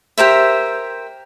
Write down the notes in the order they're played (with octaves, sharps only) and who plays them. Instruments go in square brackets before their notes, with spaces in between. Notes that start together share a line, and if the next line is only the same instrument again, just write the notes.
[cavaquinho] G4 A#4 C5 E5